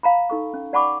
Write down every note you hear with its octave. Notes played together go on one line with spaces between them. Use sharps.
F5 A#5 B5
D#4 A4 C#6
C#4
D5 F#5 A5 B5 C#6 D6